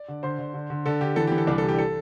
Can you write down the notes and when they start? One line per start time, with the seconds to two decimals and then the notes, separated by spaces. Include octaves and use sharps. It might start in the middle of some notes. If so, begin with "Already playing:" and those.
Already playing: D5
0.08 D3
0.23 D3 C5 C6
0.39 D3
0.54 D3
0.70 D3
0.86 D3 A4
1.01 D3 G4
1.16 E3 A4
1.27 G4
1.32 E3
1.38 A4
1.47 C2 D4 D5
1.58 A4
1.63 C3
1.69 G4
1.78 A4